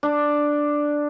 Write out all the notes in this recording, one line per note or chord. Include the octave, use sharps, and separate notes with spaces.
D4